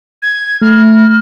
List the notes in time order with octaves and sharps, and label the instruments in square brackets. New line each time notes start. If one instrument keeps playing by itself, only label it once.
[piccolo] G#6
[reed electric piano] A3 [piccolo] F6